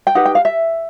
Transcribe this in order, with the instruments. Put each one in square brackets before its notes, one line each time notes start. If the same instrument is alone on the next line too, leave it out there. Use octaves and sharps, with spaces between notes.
[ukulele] G5
D#4 G4 B4 F#5
G5
F5
E5